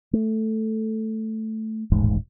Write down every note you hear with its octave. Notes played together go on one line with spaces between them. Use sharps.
A3
D#1 A1 G#2